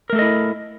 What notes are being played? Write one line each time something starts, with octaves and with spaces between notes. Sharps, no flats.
A3 E4 A4 A#4 D#5